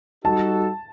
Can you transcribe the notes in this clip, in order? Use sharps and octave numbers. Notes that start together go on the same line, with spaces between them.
G3 D#4 F#4 A4 A5